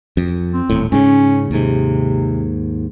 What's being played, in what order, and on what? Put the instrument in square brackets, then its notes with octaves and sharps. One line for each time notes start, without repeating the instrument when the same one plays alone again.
[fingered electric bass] F2
[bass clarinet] C4
[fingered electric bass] D#1 A2
[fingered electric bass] G#2 C#3 [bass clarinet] C#4
[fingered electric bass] D#2 G#2 [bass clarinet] C3